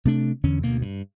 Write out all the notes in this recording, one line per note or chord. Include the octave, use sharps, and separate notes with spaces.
C3 A3 D4
E2 D3 C#4
D2 B2 A#3
G2